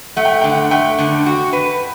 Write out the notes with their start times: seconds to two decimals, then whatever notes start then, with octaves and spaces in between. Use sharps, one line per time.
0.16 A3 F#5
0.25 G5
0.33 F#5
0.41 D3 G5
0.49 F#5
0.71 A3 G5
0.99 D3
1.26 F#4
1.53 B4